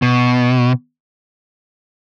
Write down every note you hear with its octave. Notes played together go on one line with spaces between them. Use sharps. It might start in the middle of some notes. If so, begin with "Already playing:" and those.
B2